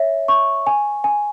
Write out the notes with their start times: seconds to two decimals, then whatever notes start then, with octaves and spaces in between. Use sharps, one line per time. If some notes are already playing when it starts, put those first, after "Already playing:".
Already playing: C#5 E5
0.28 C#6
0.67 G#5
1.04 G#5